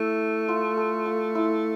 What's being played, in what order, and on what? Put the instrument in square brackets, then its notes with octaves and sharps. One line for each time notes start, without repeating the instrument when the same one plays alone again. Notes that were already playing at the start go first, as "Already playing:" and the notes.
Already playing: [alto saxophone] A3 [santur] E4
[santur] F4
A4
F4
E4